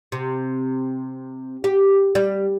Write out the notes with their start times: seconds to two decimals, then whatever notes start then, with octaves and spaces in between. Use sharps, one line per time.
0.12 C3
1.64 G4
2.15 G3